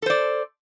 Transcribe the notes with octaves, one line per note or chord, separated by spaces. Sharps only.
A4 C5 D5